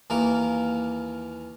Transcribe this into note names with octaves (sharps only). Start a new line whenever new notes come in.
D#2 E3 A#3 A#4